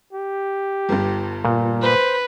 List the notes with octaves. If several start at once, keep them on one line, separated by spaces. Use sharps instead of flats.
G4
G1 G2
A#2
B4 C5